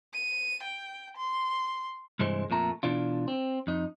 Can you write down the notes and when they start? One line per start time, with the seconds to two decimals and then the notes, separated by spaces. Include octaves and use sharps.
0.14 D#7
0.63 G5
1.17 C6
2.19 C2 G2 E3 G#3 C5
2.50 F2 A#2 A3 A#5
2.83 B2 E3 D4 F4
3.28 C4
3.67 F2 D#4